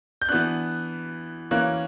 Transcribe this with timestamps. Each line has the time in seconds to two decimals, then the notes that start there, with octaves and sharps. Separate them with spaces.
0.22 G6
0.29 E3 B3 D4 F#6
1.51 E3 A#3 C#4 F#6